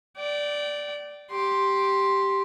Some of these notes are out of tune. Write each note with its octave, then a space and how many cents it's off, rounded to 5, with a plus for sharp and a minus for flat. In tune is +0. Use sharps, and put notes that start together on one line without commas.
D5 +0 G5 -30
G4 +0 C6 +0